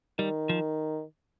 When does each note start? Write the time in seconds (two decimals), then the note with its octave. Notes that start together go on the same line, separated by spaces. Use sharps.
0.18 D#3 G3
0.49 F3